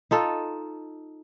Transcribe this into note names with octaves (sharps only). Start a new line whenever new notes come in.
D#4 F4 A4